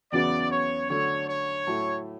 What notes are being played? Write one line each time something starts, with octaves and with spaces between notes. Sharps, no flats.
E2 C#3 F#3 B3 F#4 D5
C#5
D3 F#3 A3 C#5
C#5
A2 F#3 A3